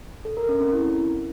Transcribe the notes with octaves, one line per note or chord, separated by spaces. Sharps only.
A4
A#4
C#4
C4
E4